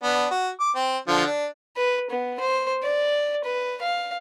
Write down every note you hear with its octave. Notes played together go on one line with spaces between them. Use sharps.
B3 D4
F#4
D6
C4
D3 F3
D4
B4
B3
C5
D5
B4
F5